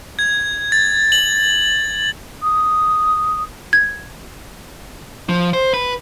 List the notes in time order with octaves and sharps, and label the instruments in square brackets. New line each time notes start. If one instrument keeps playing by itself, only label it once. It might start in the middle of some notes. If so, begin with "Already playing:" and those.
[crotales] G#6
A6
F#7
[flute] D#6
[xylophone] G#6
[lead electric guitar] F3
C5
B4